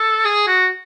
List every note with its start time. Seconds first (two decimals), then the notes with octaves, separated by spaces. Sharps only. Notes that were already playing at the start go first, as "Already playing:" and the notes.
Already playing: A4
0.25 G#4
0.47 F#4